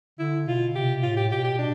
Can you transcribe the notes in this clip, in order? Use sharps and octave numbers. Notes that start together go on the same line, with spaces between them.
D3 E4
B2 F4
C3 G4
A2 F4
G4
B2 G4
G4
B2 D4